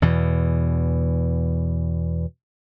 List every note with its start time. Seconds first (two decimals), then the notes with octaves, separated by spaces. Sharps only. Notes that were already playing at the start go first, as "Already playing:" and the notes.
0.02 E2 B2 E3